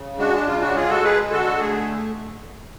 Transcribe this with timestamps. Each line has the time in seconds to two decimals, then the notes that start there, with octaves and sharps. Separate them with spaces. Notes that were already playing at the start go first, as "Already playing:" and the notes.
Already playing: C#3
0.19 G#3 D4 F#4
0.34 D4
0.47 C#3 F4
0.61 D4 F#4
0.75 G#3 F4 G#4
0.89 F#4 A4
1.03 G#3 G#4 B4
1.31 D3 F#4 A4
1.59 A3 G#4